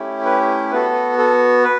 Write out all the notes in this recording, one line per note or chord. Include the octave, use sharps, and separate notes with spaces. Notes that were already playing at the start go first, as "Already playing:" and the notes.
Already playing: A3 C#4 E4 G4
B4
B3 F#4 A4 B4
A4
B4